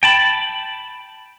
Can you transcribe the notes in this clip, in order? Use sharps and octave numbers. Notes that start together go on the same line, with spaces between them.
G5 A5 B5